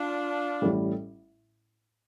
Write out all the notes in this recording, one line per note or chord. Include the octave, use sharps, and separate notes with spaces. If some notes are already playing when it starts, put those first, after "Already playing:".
Already playing: D4 F4
A1 A2 G3